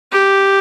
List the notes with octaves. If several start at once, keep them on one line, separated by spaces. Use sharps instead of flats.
G4